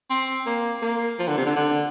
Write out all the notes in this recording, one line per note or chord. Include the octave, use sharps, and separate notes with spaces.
C4
A#3
A#3
F3
D3
C3
D3
D3